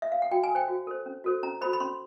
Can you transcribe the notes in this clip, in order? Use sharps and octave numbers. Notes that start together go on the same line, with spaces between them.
E5
F5
F#5
F#4 G5
G#5
A4
C5 G5
F#4
A4 C5
C#4
F#4 A4 C5
C#4 A#5
F#4 A4 C5 B5
B5
C#4 C6